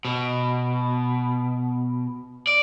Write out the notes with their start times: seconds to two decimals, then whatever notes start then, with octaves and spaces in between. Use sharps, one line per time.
0.05 B2
2.47 D5